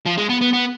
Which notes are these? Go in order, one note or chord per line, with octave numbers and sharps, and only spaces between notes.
F3
G#3
B3
B3
B3